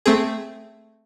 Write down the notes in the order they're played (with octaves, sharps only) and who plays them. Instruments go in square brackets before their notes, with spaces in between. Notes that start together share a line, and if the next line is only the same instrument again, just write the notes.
[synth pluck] A3 C4 G#4